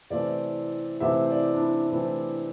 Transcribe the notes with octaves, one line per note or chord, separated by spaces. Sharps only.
C3 E3 A3 C4 D5
C3 E3 A3 C4 E5
D5
D4
E4
C3 E3 A3 C4 E4